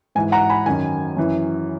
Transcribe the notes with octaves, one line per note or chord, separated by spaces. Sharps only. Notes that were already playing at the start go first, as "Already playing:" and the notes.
G#2 E3 G#5
F#5 A#5
G#5 B5
F#2 D#3 G#5
F#2 E3